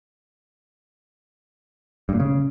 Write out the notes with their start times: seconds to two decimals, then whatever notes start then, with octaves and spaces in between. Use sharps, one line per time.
2.09 G2
2.14 A#2
2.20 C#3